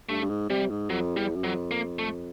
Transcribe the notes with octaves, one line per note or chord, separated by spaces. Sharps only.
G2 A3
G2
G#2
C3 G3
G#2
F2 F#3
E2 G3
F#2
F2 F#3
A#3
A3